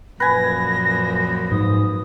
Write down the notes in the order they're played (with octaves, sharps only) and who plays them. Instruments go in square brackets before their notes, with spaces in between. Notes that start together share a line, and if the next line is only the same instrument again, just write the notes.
[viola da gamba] F#2 A#2 F3 [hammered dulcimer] B4 G#5 [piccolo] A#6
[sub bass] G#2 [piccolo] D#6